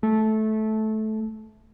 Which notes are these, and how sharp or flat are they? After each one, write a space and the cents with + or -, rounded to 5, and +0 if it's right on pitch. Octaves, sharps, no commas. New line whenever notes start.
A3 -15